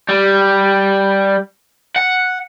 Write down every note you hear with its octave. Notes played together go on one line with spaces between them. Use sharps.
G3
F#5